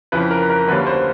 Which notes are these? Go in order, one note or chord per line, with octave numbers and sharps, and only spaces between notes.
F2 C#3 E3 B4
A#4
A#4
D2 D3 G3 A#3 C#4 B4
C5